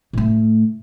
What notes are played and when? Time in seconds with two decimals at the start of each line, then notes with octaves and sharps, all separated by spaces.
0.13 A2 A3